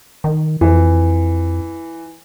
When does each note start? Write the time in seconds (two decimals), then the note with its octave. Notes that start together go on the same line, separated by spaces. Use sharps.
0.24 D#3
0.61 F2 E3